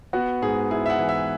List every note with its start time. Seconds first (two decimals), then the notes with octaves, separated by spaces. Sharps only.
0.13 B3 F#4
0.42 G#2 G#4
0.71 E4 G#4
0.86 E5
0.90 F#5
0.99 E3
1.09 E5